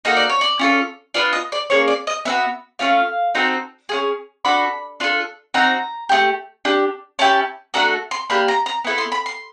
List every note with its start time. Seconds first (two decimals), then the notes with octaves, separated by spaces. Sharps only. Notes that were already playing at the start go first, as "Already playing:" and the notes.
0.05 A#3 D#4 F#4 A4 D#5
0.17 D5
0.29 C#5
0.41 D5
0.59 C#4 F4 A4
1.14 B3 D4 F4 D5
1.33 D#5
1.52 D5
1.70 A#3 C#4 G#4 C#5
1.88 D5
2.07 D#5
2.25 B3 D4 F#4 E5
2.79 A3 C#4 F4 F5
3.35 C4 D#4 F#4 A4
3.89 C#4 F4 G#4
4.45 D4 F#4 A4 B5
5.00 D4 F4 A4
5.54 C4 D#4 F#4 A#5
6.09 A3 D4 G4
6.65 D4 G4
7.19 C#4 E4 G4 A5
7.74 A3 D4 F#4 A4 A#5
8.11 C6
8.30 A#3 D4 G4 B5
8.48 A#5
8.66 A#5
8.84 B3 E4 A4
8.98 C6
9.12 B5
9.26 C6